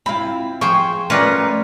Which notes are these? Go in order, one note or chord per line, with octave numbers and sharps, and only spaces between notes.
C4 E4 F4 B5
F3 G#4 C5 G5 C#6
A3 C#4 F4 A#4 B4 D5 A#5